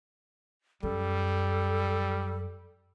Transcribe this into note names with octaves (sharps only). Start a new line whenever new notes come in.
F#2 G3 A4